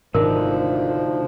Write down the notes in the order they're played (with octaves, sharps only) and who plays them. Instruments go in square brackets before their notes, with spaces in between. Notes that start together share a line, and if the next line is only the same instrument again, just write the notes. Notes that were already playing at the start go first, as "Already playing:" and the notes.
[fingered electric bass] G#1 [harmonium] D2 F3 [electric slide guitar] C3 D4 D#4 [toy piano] A#4